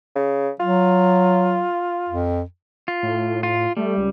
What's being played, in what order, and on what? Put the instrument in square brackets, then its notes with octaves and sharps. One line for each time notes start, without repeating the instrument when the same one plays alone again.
[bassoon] C#3
[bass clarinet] F#3 [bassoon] F4
[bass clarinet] F2
[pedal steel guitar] F4
[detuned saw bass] A2
[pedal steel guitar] F4
[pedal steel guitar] G3 [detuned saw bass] A3
[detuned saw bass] C#2